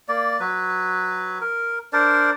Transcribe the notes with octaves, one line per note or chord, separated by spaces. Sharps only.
A#3 D5
F#3 B4
A#4
D4 A#4 C5 D5